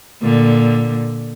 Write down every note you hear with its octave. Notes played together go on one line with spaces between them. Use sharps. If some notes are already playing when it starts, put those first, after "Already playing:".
A#2 D3